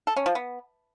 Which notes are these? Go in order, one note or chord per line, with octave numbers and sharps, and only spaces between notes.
A4
C#4
F3
B3